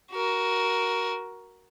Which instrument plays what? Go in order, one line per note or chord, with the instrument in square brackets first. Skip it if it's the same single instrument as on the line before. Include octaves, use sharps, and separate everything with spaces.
[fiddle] F#4 A#4